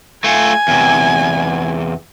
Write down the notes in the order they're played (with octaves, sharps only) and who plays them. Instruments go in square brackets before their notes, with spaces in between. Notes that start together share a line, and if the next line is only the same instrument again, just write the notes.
[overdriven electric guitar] A3 F4 [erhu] G#5
[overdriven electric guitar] E2 C3